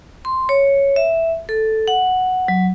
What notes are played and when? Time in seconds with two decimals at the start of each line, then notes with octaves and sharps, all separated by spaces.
0.25 C6
0.49 C#5
0.96 E5
1.49 A4
1.88 F#5
2.48 F#3